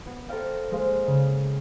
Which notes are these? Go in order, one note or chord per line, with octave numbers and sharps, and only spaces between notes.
B3 F#4
A4 A#4 C5 D5 F5 G5
G#3 A#3 C5 F5
C#3